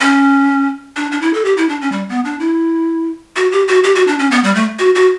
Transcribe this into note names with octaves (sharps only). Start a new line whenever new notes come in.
C#4
D4
D4
E4
A4
G4
E4
D4
C#4
G3
B3
D4
E4
F#4
G4
F#4
G4
F#4
D4
C#4
B3
G3
A3
F#4
F#4